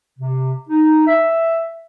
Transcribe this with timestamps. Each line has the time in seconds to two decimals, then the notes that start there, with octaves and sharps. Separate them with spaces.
0.19 C3
0.70 D#4
1.07 E5